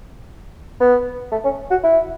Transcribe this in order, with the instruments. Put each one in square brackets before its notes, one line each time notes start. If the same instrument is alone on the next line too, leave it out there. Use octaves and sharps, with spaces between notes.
[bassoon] B3
A3
C#4
F#4
E4